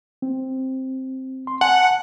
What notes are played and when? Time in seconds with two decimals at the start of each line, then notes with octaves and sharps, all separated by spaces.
0.22 C4
1.47 C6
1.61 F#5 G#5 A5